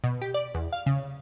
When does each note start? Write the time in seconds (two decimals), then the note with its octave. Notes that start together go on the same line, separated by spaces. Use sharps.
0.04 B2
0.22 G4
0.34 D5
0.55 E2
0.73 F5
0.86 C#3